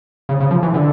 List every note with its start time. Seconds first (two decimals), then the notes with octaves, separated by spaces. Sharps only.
0.29 C#3
0.40 C#3
0.51 F3
0.63 E3
0.74 D3